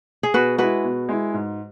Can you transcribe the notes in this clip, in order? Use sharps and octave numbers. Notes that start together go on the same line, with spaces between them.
G#4
B2 F#4 B4
G#3 E4 F#4 B4
B2
G#3 E4
G#2